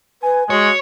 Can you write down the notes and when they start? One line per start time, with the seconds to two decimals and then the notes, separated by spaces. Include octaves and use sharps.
0.23 B4 G#5
0.50 G#3 F#4 C#5